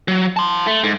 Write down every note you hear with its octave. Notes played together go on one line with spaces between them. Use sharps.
F#3
A5 C6
A3
G#2